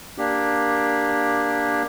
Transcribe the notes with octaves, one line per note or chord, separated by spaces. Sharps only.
A#3 D4 G4